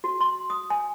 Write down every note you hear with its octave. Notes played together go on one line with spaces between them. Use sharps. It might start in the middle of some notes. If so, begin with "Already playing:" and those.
F#4
C6
D#6
G#5